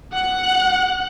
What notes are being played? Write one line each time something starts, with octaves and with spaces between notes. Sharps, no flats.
F#5 F#6